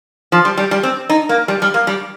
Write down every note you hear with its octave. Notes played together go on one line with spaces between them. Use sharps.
F3
G3
G3
G3
C4
D#4
A#3
G3
G3
A#3
G3